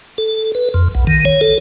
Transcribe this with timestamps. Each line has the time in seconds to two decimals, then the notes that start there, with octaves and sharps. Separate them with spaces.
0.18 A4
0.55 B4
0.74 F2
0.95 B1
1.07 D#3
1.25 C#5
1.41 A4